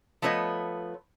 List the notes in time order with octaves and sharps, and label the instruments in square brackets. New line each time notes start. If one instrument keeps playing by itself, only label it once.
[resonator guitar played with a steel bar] F3 A3 B3 C#5 D#5